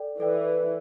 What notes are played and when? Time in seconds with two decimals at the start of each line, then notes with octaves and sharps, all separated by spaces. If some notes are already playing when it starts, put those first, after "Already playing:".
Already playing: A4 D5 G5
0.20 E3 A4 D5 G5